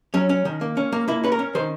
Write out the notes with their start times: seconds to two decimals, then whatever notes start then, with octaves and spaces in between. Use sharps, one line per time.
0.14 F#3 C#4
0.29 C#4
0.45 D#3
0.61 A#3
0.77 C#4
0.92 A#3
1.08 A#3 E4
1.23 C#4 B4
1.32 A#4
1.39 C#4
1.55 D#3 C5